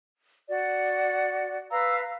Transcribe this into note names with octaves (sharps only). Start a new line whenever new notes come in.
F#4 D5
B4 F5 A#5 E6